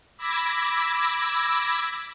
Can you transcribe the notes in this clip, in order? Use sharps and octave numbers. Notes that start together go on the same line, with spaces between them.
B5 D6 E6 G#6 A#6 B6